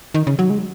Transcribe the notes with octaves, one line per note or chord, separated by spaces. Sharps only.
D#3
C#3
F#3
G#3